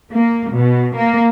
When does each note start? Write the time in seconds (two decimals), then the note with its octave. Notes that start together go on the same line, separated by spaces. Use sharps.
0.14 A#3
0.54 B2
0.97 A#3